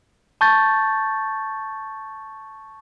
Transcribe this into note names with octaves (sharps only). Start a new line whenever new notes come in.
A5 C#6 G6 A6